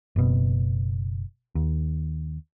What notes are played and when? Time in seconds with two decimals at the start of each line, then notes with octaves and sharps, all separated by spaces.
0.16 F#1 B2
1.55 D#2